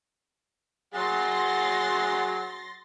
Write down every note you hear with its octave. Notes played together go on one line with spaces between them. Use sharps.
F#3 G#4 F#5 C6 A6 A#6